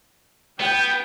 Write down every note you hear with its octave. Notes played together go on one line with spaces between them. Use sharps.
B3 G5